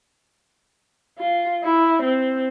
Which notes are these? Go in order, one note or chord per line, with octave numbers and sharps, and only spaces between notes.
F4
E4
C4